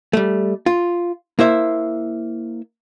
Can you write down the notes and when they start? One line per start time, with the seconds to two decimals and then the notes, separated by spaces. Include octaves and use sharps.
0.13 G3 A3
0.66 F4
1.39 A#3 E4 C5 E5